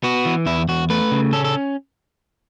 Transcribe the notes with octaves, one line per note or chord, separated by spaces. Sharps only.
B3 F#4
E3
E2 E4
E2 F#4
A3 B4
C#3
C#4 A4
A4